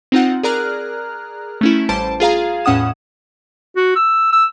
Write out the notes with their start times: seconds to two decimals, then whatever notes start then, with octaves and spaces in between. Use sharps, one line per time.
0.12 C4 D#4 F4 F#5
0.43 G#4 A#4 D5 A#5 F6 F#6
1.61 A3 C#4 E4
1.89 A1 G3 C5 A5 D7
2.20 F4 G#4 F5 A#5
2.65 E2 A2 C#4 F#5 D#6 E7
3.76 F#4
3.96 E6
4.33 E6